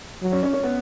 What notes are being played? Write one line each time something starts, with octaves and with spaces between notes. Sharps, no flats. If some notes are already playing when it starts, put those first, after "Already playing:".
F#3
C#4
C#4
C#4
B3